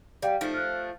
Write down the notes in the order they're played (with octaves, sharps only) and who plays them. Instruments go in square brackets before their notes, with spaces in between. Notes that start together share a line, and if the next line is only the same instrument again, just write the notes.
[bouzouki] G3 [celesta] D5 F5 G5
[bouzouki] F3 A3 [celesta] D#4
[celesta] F6 F#6